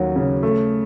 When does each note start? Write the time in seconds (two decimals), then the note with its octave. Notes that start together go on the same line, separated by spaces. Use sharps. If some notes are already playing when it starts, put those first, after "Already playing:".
Already playing: D#2 F#3 C#4
0.16 C#3
0.43 A3